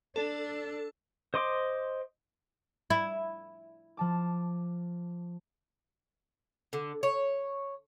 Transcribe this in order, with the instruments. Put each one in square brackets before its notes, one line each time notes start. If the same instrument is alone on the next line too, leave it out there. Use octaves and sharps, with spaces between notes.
[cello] D4 [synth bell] A4
[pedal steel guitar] C5 D#5 C6 D6
[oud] E4
[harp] F3 A5 D6
[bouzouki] D3
C#5